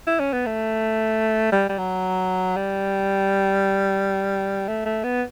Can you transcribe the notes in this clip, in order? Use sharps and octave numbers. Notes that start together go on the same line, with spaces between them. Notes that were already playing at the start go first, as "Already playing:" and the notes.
E4
C#4
B3
A3
G3
G3
F#3
G3
A3
A3
B3